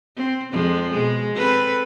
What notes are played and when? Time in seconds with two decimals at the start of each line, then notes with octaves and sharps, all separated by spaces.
0.16 C4
0.52 F2 F3 G#3
0.90 B2 G#3
1.35 C4 A4 B4